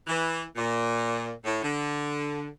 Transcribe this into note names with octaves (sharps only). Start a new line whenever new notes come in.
E3
A#2
A2
D3